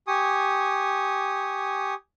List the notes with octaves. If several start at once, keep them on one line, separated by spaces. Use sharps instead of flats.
G4 G#5 C#6 D#6